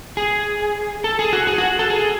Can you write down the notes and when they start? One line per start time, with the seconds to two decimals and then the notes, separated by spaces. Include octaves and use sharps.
0.17 G#4
1.04 A4
1.19 G#4
1.33 F#4
1.47 G#4
1.58 F#4
1.79 A4
1.90 G#4